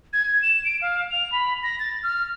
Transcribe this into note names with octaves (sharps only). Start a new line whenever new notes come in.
G#6
E7
D7
F5
F7
B5
A#6
A6
F6